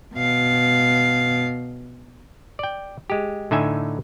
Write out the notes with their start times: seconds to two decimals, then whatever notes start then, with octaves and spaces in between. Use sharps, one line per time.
0.15 B2 F5
2.59 D5 G5
3.10 G#3 G4
3.51 A2 D3 D#4 E5 G#5